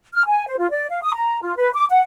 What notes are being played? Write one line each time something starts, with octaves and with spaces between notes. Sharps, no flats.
F6
G#5
C5
F4
D5
F5
D#6
A#5
F4
B4
D6
F#5